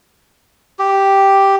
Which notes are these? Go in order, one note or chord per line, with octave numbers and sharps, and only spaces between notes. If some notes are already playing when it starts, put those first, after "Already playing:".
G4